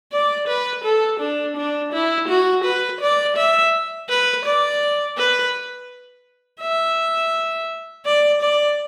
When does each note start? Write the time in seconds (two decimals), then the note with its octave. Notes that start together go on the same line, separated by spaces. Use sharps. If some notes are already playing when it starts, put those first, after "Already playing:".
0.12 D5
0.48 B4
0.84 A4
1.20 D4
1.56 D4
1.93 E4
2.28 F#4
2.64 B4
3.01 D5
3.37 E5
4.09 B4
4.45 D5
5.17 B4
6.61 E5
8.06 D5
8.42 D5